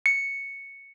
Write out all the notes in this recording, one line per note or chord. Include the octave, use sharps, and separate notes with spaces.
C#7